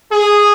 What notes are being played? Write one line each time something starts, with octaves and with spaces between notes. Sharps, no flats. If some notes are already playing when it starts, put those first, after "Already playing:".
G#4